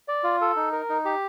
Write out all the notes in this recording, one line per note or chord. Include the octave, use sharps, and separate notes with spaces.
D5
F4
A4
D#4
A#4
D#4
G4